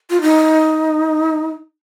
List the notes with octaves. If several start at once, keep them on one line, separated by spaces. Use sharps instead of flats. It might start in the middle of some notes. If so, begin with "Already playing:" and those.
F4
D#4